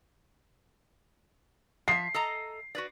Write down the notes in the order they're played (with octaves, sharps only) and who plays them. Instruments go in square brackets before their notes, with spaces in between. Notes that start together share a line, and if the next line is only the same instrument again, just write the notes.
[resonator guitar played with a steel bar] F3 E5 [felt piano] C7
[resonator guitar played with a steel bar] A4 D#5 A#5
F#4 B4 D5